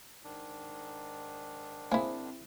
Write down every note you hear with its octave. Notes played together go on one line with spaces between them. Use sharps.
G#2 D#3 D4
A#3 C4 E4 G#4